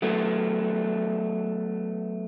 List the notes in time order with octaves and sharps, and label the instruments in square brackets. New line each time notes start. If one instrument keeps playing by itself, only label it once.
[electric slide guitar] F#3 A3 B3